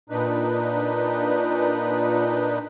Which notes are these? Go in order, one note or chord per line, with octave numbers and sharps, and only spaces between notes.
A#2 D4 D#4 B4